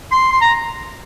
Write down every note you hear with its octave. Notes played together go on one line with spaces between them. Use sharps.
C6
C6
A#5